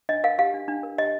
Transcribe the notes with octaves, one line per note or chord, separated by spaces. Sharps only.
D4 D#5
A#4 F5
G4 F5
D4
D4
A#4
G4 D#5